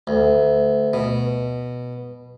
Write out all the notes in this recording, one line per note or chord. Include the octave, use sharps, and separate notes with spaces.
D2
B2